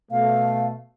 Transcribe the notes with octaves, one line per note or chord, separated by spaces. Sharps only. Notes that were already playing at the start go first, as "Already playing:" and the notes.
B2 A3 F5